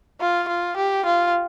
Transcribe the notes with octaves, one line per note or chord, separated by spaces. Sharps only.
F4
F4
G4
F4